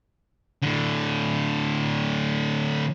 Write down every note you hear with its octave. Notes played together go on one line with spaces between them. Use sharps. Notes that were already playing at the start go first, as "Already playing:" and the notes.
A2 D3